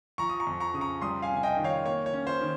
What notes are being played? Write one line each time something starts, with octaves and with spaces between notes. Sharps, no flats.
F3 A#5 C#6
D#6
A#5 C#6
F2
A#5 C#6
C#3 D#6
A#5 C#6
G3 C6 D#6
F5 G#5
C3
G#5
D#5 G5
D#3
C#5 F5
A#3 C#5
C#5
C#4
C5
D#3